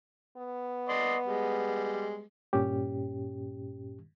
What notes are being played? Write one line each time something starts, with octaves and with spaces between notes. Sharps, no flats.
B3
D5 D#5 C6
G3 G#3
G2 A#2 C#4 G4